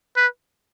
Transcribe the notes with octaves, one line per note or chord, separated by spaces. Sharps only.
B4